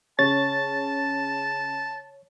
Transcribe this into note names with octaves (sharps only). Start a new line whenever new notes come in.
C#3 C#5 A5 A6